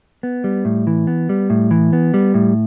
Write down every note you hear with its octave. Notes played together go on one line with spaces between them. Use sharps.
B3
G3
A2
E3
B3
G3
A2
E3
B3
G3
A2